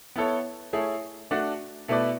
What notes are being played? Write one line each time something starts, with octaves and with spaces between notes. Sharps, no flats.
B3 E4 A4 C#5
A3 E4 G#4 C#5
A3 D4 F#4
B2 A3 E4 B4 D5